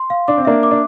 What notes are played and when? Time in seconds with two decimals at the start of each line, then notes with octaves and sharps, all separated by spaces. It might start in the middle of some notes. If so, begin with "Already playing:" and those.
Already playing: C6
0.10 F5
0.28 D4 D6
0.38 C4
0.45 A#3 D4 E5
0.63 D6
0.71 D4